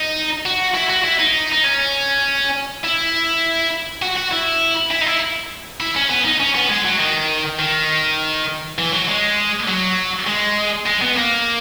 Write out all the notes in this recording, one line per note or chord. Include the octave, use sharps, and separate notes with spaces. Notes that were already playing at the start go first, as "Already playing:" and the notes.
Already playing: D#4
F#4
E4
F#4
E4
D#4
D#4
C#4
E4
F#4
F#4
E4
E4
D#4
E4
E4
C#4
B3
D#4
C#4
B3
G#3
F#3
D#3
D#3
E3
F#3
G#3
F#3
G#3
G#3
B3
A#3